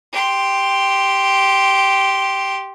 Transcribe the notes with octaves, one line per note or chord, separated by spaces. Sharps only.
G4 C6